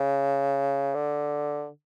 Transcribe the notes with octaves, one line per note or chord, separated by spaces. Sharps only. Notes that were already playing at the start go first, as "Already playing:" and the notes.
Already playing: C#3
D3